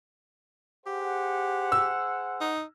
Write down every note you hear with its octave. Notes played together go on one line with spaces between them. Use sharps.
G4 G#4 C5 F#5
E6
D#4